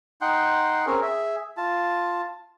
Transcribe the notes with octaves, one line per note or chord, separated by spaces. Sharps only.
D#4 F#5 G5 C6
C4 C#4 G#4 A#4
G#4 E5
F4 A5